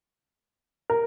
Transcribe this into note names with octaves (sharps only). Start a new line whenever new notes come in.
A#4